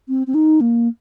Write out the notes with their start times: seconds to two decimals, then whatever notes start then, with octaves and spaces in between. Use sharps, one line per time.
0.09 C4
0.27 C4
0.34 D#4
0.61 A#3